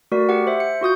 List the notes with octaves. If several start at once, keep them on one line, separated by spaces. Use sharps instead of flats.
A3 F#4 A#4 D5 B6
G4 F#5
C5 E5
C#7
F4 F#4 D#6 G6